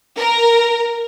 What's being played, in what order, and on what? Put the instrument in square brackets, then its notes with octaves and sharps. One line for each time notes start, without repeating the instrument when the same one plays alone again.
[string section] A#4